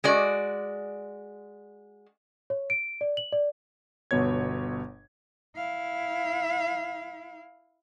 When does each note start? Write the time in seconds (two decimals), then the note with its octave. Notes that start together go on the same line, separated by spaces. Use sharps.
0.04 G#3 F#4 D5
2.50 C#5
2.70 D7
3.01 D5
3.17 F#7
3.32 D5
4.11 G1 B2 B3 C#5 G#6
5.56 E4 F5